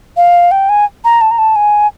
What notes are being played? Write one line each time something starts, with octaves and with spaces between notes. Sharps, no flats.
F5
G5
G#5
A#5
A5
A#5
A5
G#5